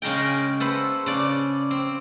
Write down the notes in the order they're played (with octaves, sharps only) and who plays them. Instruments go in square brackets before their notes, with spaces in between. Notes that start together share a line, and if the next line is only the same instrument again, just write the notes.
[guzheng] C#3 G#3 A#4 G5
A4 B4 C5 F#5
C#3 D5
C4